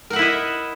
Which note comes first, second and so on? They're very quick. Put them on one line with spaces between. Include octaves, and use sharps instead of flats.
A#4 F#5 E5 E4 D#5